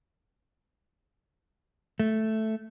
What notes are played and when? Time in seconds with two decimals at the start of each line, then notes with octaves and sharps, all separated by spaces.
2.00 A3